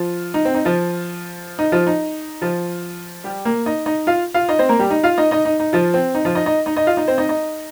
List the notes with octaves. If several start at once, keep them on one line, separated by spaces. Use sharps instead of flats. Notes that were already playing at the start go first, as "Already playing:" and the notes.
Already playing: F3 F4
D#4
C4
D#4
F3 F4
D#4
F3 F4
D#4
F3 F4
G3 G4
A#3 A#4
D#4 D#5
D#4 D#5
F4 F5
F4 F5
D#4 D#5
C4 C5
A#3 A#4
G3 G4
D#4
F4 F5
D#4 D#5
D#4 D#5
D#4
D#4
F3 F4
C4
D#4
F3 F4
D#4 D#5
D#4 D#5
D#4 D#5
D#4 D#5
F4 F5
D#4 D#5
C4 C5
D#4 D#5
D#4 D#5